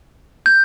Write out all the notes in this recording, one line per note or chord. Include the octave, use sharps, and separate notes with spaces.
G6